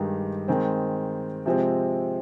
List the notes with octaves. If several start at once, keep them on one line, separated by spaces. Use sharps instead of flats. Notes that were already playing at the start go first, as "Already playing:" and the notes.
Already playing: G2 D#3 G#3 D#4 G4
D#3 G#3 C4
C3 F3 G#3 C4